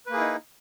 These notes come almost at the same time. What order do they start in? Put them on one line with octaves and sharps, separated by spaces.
B4 A#3 G#4 E4 D#4